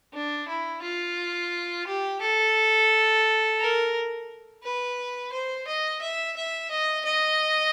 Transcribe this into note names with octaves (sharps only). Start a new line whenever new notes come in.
D4
E4
F4
G4
A4
A#4
B4
C5
D#5
E5
E5
D#5
D#5